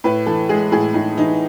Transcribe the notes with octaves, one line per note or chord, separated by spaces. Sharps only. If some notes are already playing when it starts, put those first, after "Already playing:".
A2 B4
E3 A4
G#3 G#4
A2 G#4
A2 D#4
E3 D#4